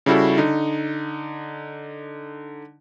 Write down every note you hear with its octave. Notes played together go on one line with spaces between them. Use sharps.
C#3 G3 E4 F#4 A4
D3 D#4